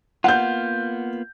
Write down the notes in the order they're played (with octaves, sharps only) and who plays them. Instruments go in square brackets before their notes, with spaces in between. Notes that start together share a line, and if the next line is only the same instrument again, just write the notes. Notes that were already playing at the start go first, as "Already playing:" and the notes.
[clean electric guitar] A#3 B3 F4 [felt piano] F#5 G6